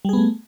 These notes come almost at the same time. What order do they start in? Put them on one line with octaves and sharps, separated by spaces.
G3 G#4 B3 A3